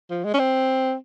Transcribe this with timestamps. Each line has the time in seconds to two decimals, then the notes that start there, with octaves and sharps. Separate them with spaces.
0.10 F3
0.24 G#3
0.34 C#4
0.39 C4